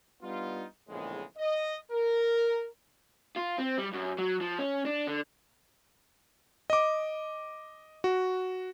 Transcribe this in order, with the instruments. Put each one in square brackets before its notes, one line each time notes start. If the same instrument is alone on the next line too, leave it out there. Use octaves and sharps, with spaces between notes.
[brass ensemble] G3 B3 D4 D#4 F4
A#1 E2 A2 C#3 G#3
D#5
A#4
[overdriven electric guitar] F4
C4
G3
F#2
F#3
F3
C#4
D4
D3
[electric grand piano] D#5 D6
F#4